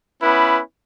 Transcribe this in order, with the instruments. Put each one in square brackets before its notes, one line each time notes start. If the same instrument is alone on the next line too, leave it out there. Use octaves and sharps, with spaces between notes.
[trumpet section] B3 C#4 E4 B4